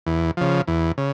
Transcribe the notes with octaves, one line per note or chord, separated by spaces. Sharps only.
E2
C#3 F3
E2
C#3